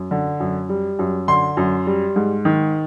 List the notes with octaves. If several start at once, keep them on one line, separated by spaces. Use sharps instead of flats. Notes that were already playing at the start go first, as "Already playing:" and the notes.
Already playing: F#2
D3
F#2
G3
F#2
D3 C6
F#2
G3
G#2
D#3